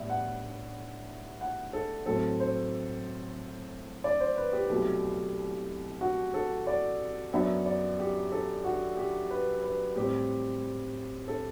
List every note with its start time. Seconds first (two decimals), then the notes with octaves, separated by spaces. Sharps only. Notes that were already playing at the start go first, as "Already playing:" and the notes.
Already playing: A2 G3 B3 D4 E5
0.10 F#5
1.41 F#5
1.73 A4
2.06 A2 F#3 A3 C4 A4
2.40 C5
4.04 D5
4.20 C5
4.37 B4
4.53 G4
4.69 C2 B2 F#3 A3
6.01 F#4
6.34 A4
6.67 D5
7.33 F#2 F#3 B3 D4 E5
7.66 D5
7.99 G4
8.32 A4
8.65 F#4
8.97 G4
9.30 B4
9.63 B4
9.96 A2 G3 C4 G4
11.28 A4